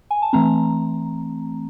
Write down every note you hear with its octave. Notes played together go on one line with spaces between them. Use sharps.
G#5
A5
E3 A3 C4 A#5